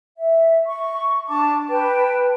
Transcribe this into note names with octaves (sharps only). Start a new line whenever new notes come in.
E5
C#6
D4 A5 D6
B4 G5 A5